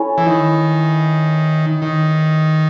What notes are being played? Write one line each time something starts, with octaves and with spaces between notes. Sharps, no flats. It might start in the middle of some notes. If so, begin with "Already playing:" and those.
Already playing: C#4 E4 A4
E3
D#3
D#3